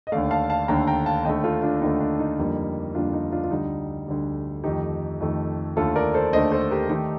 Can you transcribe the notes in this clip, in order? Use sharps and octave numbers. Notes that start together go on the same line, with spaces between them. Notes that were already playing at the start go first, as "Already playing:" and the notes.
D#5
D#2 D3 A3 D5 F5
F5 A5
F5 A5
D#2 D3 A3 G5 A#5
G5 A#5
F5 A5
D#2 D3 A3 D#5 G5
F4 A4
D4 F4
D#2 D3 A3 D#4
D4
D#4
F2 D3 G3 A#3
F2 D3 G3 A#3 D4 F4
D#4
D4 F4
F4
D2 D3 G3 D#4
D2 D3 G3
F2 D#3 A3 D#4 G4
F2 D#3 A3
D#2 D3 A3 F4 A4
A#4 D5
A4 C5
D#2 D3 A3 C5 D#5
A4 C5
G4 A#4
D#3 A3 D#4 G4